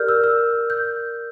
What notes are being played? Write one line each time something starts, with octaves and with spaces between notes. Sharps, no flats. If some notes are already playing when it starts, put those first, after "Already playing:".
Already playing: G4 A#4 D5 F6 G6
E6
E6
G6